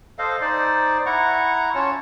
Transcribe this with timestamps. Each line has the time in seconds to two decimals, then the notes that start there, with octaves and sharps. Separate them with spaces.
0.19 A4 C5 D#5 F5
0.41 D#4 C5 D5
1.06 E4 F#5 A#5 C#6
1.75 C#4 F4 C#5 A5